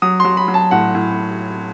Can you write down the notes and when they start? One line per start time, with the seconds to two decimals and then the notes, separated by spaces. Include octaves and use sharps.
0.02 F#3 D#6
0.20 F#3 C6
0.37 B5
0.48 F#3
0.54 A5
0.71 A2 F#5
0.95 A2